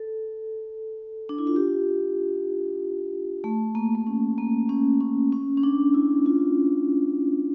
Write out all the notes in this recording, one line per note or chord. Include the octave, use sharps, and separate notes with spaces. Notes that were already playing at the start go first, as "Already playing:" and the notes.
Already playing: A4
D4
E4
F4
G4
A3
A#3
A#3
C#4
A#3
C#4
C#4
C#4
C#4
D4
E4
F4